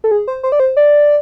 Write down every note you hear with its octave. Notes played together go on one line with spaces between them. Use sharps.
A4
G#4
C5
C5
D5
C5
D5